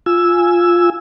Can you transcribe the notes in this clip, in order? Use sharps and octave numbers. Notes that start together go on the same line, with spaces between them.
F4 G#5 E6